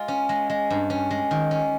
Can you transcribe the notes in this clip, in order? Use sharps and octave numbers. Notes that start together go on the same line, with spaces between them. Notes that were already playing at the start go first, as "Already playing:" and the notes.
Already playing: G#3 F4
C#4
G#3
G#3
G2
C#4
G#3
D#3
C#4